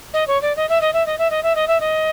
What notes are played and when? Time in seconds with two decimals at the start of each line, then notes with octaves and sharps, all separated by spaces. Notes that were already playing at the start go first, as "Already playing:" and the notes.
0.14 D#5
0.27 C#5
0.42 D5
0.56 D#5
0.69 E5
0.81 D#5
0.93 E5
1.06 D#5
1.18 E5
1.30 D#5
1.43 E5
1.55 D#5
1.68 E5
1.80 D#5